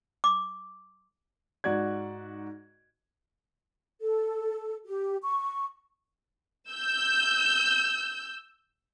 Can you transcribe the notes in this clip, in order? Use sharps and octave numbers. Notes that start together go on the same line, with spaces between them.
D6
G#2 F#4 D5 G#6
A4
G4
C#6
E6 G6